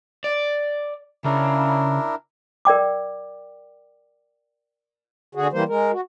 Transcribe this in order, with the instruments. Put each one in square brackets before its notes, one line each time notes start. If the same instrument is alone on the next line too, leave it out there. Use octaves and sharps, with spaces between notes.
[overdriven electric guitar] D5
[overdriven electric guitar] C#3 [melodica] D4 E4 A#4
[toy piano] A#4 D5 G5 D6
[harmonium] D3 F#4 G#4
E3 G3 A#3 C5
G#3 A#4
F#4